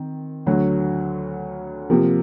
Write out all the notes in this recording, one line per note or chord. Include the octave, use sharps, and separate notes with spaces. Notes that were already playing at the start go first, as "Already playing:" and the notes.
Already playing: D#3 C4
D2 D3 F#3
C3 F3 A#3